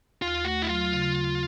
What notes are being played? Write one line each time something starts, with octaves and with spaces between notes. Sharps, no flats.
D#2 F4
A3 F#4
E4
F#3 F4
C#3
D#2